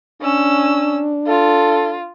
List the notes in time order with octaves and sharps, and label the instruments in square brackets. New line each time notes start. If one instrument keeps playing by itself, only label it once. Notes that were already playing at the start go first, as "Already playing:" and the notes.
[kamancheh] C#4 E6 [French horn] D4
[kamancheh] F4 [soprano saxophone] A4